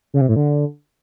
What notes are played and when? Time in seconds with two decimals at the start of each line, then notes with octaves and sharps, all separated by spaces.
0.14 C#3
0.21 C3
0.29 A2
0.36 D3